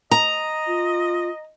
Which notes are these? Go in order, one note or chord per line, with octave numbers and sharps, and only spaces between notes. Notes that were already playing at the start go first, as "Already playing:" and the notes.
D#5 A#5
F4